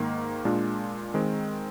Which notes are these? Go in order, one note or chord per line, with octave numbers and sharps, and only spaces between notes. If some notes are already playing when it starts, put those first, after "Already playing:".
Already playing: G#2 D#3 A#3
A#2 G#3 D4 F4
D#3 G#3 C4